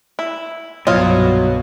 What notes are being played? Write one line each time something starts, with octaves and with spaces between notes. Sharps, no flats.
E4
C2 G2 B2 F#3 F4 D#5